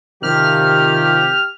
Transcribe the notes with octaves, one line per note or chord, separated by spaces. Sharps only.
C3 D#3 F3 G4 F6